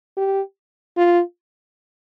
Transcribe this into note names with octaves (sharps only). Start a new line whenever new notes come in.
G4
F4